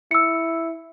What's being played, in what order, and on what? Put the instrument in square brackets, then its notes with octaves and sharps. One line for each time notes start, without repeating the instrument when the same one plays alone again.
[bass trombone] E4 [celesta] E6 C#7